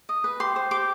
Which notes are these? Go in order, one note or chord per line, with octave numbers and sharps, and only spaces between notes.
D#5
B4
G4 C6
C5
G4 D6